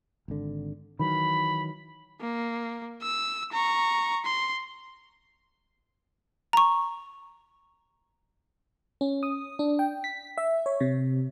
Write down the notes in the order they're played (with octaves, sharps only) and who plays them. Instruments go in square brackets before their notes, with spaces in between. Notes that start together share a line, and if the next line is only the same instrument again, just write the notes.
[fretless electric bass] G#1 D3
[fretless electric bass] D#3 E3 F#3 [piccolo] B5
[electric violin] A#3
E6
A#5 C#6
C6
[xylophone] A#5 C#6
[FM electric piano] C#4
D#6
D4
G5
B6
E5
C#5
C3